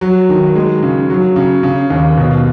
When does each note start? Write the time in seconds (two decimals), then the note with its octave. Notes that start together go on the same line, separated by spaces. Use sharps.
0.01 F#3
0.29 D#3
0.55 G#3
0.83 C#3
1.10 F#3
1.36 C#3
1.63 C#3
1.90 D#2
2.17 B2